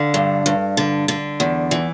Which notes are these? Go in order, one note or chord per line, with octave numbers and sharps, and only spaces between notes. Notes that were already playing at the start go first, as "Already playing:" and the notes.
Already playing: D3 F5
G2
G2
D3
D3
E2
E3